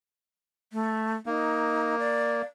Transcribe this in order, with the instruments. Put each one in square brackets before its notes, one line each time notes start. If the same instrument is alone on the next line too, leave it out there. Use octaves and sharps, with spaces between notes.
[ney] A3
[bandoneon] A#3 [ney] D#4
[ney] D5